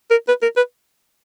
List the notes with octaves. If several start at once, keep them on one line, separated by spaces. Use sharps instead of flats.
A#4
B4
A#4
B4